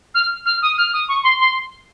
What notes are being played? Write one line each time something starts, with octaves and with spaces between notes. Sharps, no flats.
F6
F6
D#6
F6
D#6
C#6
C6
C6